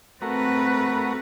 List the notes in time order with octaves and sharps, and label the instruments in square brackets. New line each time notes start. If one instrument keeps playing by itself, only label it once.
[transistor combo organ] A3 F#4 A#4 [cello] C4 B4